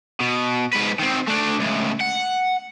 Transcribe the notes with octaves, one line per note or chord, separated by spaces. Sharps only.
B2
G#2 B4
D#3 C4
A3 D4
C#2 A2
F#5